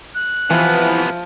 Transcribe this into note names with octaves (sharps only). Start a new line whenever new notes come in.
F#6
C3 E3 F3 B3